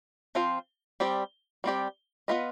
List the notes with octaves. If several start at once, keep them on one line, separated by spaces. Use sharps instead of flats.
F3 C4 F4 C5
G3 C4 G4 D5
G3 C4 G4 D5
B3 F4 B4 D#5